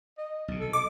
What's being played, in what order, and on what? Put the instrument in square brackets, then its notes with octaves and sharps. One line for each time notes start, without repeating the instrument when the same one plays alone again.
[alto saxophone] D#5
[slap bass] B1 C3
[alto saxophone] A4
[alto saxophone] D#5 [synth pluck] D6